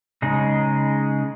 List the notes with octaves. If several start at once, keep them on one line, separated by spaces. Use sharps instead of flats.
C#3 G#3 D#4 G#4